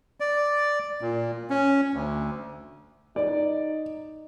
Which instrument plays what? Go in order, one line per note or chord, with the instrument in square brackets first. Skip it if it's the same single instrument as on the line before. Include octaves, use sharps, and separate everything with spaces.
[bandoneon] D5
A#2
C#4
D2
[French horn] D#4 [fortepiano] D5